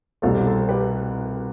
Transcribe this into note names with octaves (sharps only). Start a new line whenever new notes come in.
C2 B2 G3 A4 C5
A4 C5
G4 B4